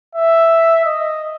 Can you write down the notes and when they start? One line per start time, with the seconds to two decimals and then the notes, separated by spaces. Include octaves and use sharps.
0.15 E5
0.85 D#5